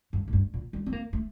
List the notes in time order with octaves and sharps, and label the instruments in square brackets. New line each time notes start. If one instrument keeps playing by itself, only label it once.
[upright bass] G2
A2
G2
A#2
G3
C4
A#3
A3